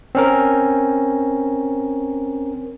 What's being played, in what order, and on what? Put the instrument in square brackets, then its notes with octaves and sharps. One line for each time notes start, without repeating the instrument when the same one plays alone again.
[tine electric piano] C4 C#4 A#4